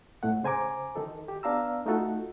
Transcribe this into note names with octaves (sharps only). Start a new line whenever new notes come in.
A2 A3 F#5
C#3 C5 G#5 A#5 D6
D#3 D#4 A4
G4
B3 D4 F5 A#5 E6
A3 D#4 F4 F#4 A4